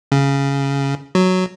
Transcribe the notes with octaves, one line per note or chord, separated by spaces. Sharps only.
C#3
F#3